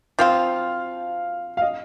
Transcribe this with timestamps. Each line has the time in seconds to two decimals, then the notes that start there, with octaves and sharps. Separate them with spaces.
0.19 F3 C4 F4 F5
1.57 F5
1.62 D#5